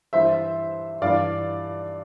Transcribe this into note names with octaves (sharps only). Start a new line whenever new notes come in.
G2 E3 C5 E5
G2 E3 D5 F5